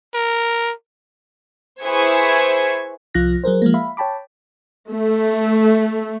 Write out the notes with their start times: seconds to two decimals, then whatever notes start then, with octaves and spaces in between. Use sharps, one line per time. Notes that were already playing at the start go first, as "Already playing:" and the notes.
0.15 A#4
1.82 E4 G#4 B4 C5 C#6 G#6
3.14 C2 F3 F4 F#6 A#6
3.44 F#3 G#4 A#4 C5
3.62 F3 G#3 A#3
3.74 E5 F5 B5
3.97 C#5 G5 A5 B5 D6
4.89 A3